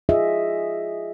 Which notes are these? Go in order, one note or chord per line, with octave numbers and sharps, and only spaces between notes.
F4 G#4 D#5 E5